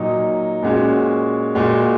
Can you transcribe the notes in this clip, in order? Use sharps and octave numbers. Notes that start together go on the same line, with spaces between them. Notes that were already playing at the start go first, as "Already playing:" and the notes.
Already playing: A#2 F#3 D#4
A#2 G#3 C#4 F#4
A#2 G#3 F#4